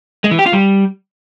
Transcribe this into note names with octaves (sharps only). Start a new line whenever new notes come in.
G#3
E3
G4
F4
G3